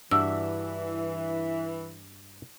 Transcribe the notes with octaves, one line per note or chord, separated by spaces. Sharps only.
G2 E3 D4 F#4 E5 E6